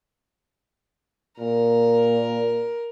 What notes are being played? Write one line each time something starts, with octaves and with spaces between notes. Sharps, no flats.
A#2 A#4